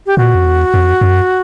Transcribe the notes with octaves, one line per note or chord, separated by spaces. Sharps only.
G4
A#2 F#4
F2
E2
F2
F#2